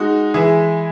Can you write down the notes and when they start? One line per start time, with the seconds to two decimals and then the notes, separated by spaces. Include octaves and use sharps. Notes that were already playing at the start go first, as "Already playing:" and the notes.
Already playing: G#3 D#4 F#4
0.34 E3 E4 G#4